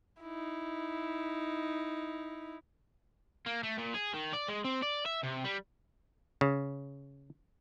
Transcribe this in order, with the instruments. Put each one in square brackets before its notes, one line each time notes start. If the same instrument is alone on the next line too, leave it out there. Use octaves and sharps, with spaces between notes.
[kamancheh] D#4 E4
[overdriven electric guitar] A#3
A3
A#2
G#4
D#3
D5
G#3
C4
D5
E5
C3
G3
[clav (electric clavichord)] C#3